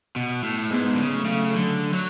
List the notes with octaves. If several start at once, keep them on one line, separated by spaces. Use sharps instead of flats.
B2
A2
G#2 G#3 B3
D3
C#3
F#3 A3
C#3
D3
F#3